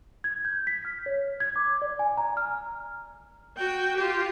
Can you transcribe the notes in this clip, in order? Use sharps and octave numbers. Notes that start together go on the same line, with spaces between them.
G#6
G6
B6
F6
C#5
G#6
D6
D5
G#5
A#5
F6
F#4 G5
F4 G4